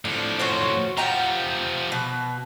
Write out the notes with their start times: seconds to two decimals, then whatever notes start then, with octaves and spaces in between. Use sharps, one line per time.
0.05 A2 F3 D4
0.39 C#4 F#4 C5
0.97 F3 G4 F#5 G5 A#5
1.92 B2